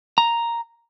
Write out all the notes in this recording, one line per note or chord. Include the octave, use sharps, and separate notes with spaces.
A#5